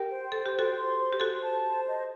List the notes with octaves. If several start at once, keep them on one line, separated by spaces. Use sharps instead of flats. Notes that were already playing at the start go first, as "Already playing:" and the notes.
Already playing: G4 A#4 G5
C5
A4 G5
G4
F#4 A4 C5
C6
C5
G4
F#4 A4 C5
A5
C5
D#5